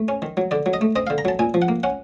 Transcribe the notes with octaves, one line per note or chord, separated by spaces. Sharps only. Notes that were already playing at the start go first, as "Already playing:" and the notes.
Already playing: A3
C#4
D#3
F#3
D3 D5
F#3
D#5
A3
C4 D#5
D3 F5
A#5
F#3 A5
A#2 G#5
F3
F#5
A#3
C#4 F#5